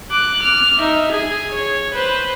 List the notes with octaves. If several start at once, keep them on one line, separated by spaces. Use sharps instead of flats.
D6 F#6
F6
D#4 E5
G#4 G#5
C#5
B4 C5